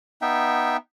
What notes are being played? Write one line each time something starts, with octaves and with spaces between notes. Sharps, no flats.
B3 D#4 E5 G5